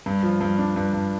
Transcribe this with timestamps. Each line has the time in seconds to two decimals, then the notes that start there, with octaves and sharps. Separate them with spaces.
0.06 G2
0.23 F3
0.41 G2
0.58 D4
0.76 G2
0.93 G2